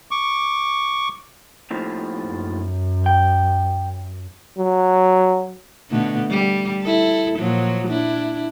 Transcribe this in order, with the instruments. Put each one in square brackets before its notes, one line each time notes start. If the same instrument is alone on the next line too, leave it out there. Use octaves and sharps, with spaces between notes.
[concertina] C#6 D6
[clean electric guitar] D#2 A2 F3
[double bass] F#2
[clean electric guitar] G5
[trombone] F#3
[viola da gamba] B2 D3 A3
G3
E4 A4
A#2 F3 F#3
D4 E4